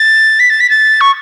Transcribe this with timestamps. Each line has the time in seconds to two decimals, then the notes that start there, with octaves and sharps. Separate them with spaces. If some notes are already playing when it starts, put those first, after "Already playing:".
Already playing: A6
0.40 B6
0.50 A6
0.61 B6
0.70 A6
1.01 C#6